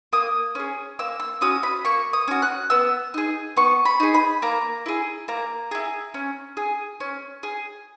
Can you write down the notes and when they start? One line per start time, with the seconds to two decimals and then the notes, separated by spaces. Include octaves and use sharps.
0.13 A#3 D#6
0.55 C#4 G#4
0.99 A#3 E6
1.20 E6
1.41 C#4 F#4 D#6
1.63 B5
1.85 A#3 C#6
2.13 D#6
2.28 C#4 F#4
2.42 F#6
2.70 B3 E6
3.14 D#4 G#4
3.57 B3 C#6
3.85 B5
4.00 D#4 G#4
4.14 B5
4.42 A#3 A#5
4.86 E4 G#4
5.28 A#3 A#5
5.71 E4 G#4
6.14 C#4
6.57 G#4
7.00 C#4
7.43 G#4